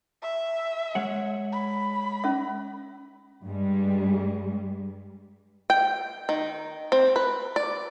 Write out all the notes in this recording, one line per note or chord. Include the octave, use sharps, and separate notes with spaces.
E5
G#3 C#5 F#5
B5
C#4 E5
G2 G3 G#3
G5
D#3
C4
B4
D5